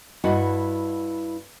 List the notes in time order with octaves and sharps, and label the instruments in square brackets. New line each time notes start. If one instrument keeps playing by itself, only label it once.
[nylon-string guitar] G2 E4 F#4 D#5 F#5